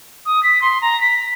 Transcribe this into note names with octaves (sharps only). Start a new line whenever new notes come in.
D#6
B6
C6
A#5
B6